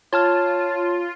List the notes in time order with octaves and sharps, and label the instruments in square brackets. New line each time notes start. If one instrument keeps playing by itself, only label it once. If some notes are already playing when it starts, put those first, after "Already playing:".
[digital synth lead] F4 [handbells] C#5 A5 F6